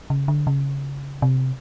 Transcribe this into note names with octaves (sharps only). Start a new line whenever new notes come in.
C#3
D3
C#3
C3